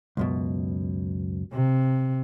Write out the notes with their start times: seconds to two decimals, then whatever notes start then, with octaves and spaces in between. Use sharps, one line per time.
0.17 C#2 F#2 B2
1.53 C3